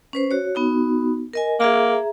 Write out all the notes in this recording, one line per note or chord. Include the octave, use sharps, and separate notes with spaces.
C#4 B4 C5
F#4 C#5
B3 D#4 F#4
A#4 D#5 G#5
A#3 G#4 E5 A#5